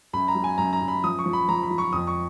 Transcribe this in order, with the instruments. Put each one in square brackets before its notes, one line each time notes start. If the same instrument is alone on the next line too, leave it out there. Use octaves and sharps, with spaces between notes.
[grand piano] F#2 B5
A#5
F#3
G#5
F#2 A#5
A#5
F#2
B5
F3 D#6
C#6
F3
B5
F3 A#5
B5
F3
C#6
F2 D#6
C#6